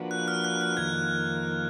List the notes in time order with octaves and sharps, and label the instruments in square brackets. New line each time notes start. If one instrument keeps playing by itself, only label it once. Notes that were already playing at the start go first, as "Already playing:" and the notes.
Already playing: [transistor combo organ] F3 A#3 D4 F#4 B4
[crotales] F#6
F6
F#6
F#6
[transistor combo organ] F2 D#3 A#3 [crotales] G#6